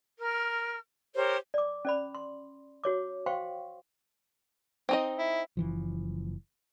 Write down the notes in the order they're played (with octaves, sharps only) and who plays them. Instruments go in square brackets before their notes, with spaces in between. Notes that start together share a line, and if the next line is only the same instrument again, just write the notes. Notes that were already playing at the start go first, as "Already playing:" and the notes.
[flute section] A#4 F6
G4 A#4 C5 C#5
[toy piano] D5 D6
C#4 D5 B5
C6
F#4 C#5 D6
C5 F5 G5 C6 C#6
[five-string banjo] C4 D#4 D#5
[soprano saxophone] E4
[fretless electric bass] F#1 E3 F3